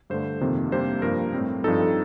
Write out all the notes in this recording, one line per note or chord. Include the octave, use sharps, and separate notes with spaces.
G2 D3 A3 C5
F2 C3 D#3 A#3
C3 G3 A#3 D4 C5
G2 F3 A#3 A#4
A2 G3 C4
G2 F3 C4 D#4 A4